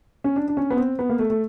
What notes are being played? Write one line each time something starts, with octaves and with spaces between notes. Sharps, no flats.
C#4
D4
D4
C#4
B3
C4
B3
A#3
A3
A3